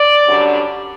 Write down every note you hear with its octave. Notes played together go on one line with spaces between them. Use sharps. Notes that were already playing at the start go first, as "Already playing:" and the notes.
Already playing: D5
F#2 D3 G3 D4